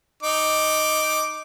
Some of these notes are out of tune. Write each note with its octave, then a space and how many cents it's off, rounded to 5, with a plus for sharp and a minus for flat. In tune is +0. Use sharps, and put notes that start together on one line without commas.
D#4 +0 D6 +0